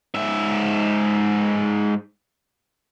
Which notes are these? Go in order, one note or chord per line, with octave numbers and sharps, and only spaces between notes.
G#2 E5